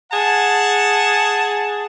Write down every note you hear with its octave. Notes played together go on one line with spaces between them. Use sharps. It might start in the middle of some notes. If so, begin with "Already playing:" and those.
G#4 F#5 A5